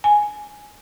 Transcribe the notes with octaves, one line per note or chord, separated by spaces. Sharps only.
G#5